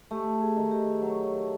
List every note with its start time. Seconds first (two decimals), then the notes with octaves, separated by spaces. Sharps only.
0.11 A3 G4
0.42 G#4
0.56 D#3
0.71 G4
1.02 F#3